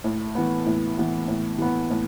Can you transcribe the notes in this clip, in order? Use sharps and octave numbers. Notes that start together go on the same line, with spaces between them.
A2
E3 B3
A2
E3 B3
A2
E3 B3
A2